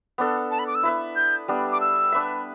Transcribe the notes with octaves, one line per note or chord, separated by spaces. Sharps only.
B3 D4 A4
A5
B5
D6
E6
E4 B4 E5
G6
G3 B3 D4
D6
E6
D4 B4 E5